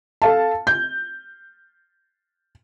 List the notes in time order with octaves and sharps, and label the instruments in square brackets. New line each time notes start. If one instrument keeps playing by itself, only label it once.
[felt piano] A4 F5 A5
G6